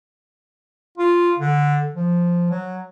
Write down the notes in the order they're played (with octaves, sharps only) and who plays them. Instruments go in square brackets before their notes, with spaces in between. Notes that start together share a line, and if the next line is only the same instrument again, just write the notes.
[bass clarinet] F4
D3
F3
F#3